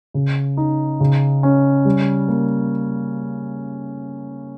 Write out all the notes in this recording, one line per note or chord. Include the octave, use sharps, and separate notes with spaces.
C#3
D#4
C#3
C#4
G3
A#3